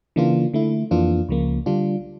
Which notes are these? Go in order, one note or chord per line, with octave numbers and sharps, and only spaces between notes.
C#3 E3 A#3 D4 F4
D3 A3 E4
F2 E3 A#3 D4 F4
C#2 C#3 F3 A#3
D3 G3 D4 F4